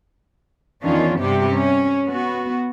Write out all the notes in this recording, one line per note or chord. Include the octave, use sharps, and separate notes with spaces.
E2 D#3 C#4 D4 F4
G2 C3 G3 B3 G4
C#4
B3 F#4